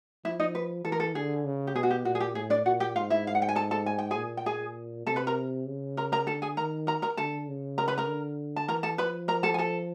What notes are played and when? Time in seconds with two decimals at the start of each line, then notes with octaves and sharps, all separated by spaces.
0.25 F3 E4 E5
0.39 D#4 D#5
0.55 B4
0.85 E3 A4
0.92 A#4
1.00 A4
1.15 D3 G#4
1.45 C#3
1.67 G4
1.75 B2 G#4
1.83 F#4
1.91 G4
2.05 A#2 F#4
2.15 G#4
2.20 G4
2.35 A2 G#4
2.50 D4 D5
2.66 A#2 F#4 F#5
2.80 G4 G5
2.96 G#2 F4 F5
3.10 E4 E5
3.27 F5
3.35 F#5
3.42 G5
3.49 G#5
3.55 A4 A5
3.71 A4 A5
3.86 G#5
3.98 G5
4.11 G#4 G#5
4.17 A#2
4.37 G5
4.46 G#4 G#5
5.06 C3 A4 A5
5.16 B4 B5
5.27 A#4 A#5
5.67 C#3
5.97 A#4 A#5
6.12 A#4 A#5
6.27 D3 A4 A5
6.42 G#4 G#5
6.57 D#3 A#4 A#5
6.87 A#4 A#5
7.02 A#4 A#5
7.17 D3 A4 A5
7.48 C#3
7.78 A#4 A#5
7.88 B4 B5
7.98 A#4 A#5
8.08 D3
8.56 A5
8.68 E3 A#4 A#5
8.83 A4 A5
8.98 F3 B4 B5
9.28 A#4 A#5
9.43 A4 A5
9.54 G#5
9.58 A4 A5